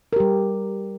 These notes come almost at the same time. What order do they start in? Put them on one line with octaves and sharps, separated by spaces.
A#4 G4 G3